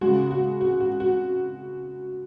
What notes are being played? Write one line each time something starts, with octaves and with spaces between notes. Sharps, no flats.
C#3 G#3 F#4
F#4
F#4
F#4
F#4